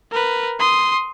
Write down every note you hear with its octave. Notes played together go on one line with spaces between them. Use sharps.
A#4 B4
C6 D#6